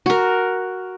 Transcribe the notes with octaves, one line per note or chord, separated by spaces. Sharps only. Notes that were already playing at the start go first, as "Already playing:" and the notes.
F#4 A#4